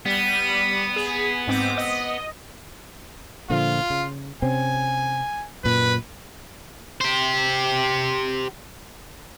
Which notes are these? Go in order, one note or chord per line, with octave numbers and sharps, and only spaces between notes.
G3 B3 D#7
G#4
G#2 C4 D6
D#5
A#2 D3 F3 F4
C#3
C3 C4 C#4 G#5
F#2 A#2 B4
G4 C5